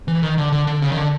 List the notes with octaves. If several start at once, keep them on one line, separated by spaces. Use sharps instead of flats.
E3
D#3
D3
D3
D3
C#3
D#3
D3